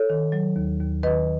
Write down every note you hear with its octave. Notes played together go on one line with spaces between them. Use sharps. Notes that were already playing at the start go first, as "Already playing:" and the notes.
Already playing: A4 C#5
D#3
F#3
D#2
D#2
D#3 B4 D#5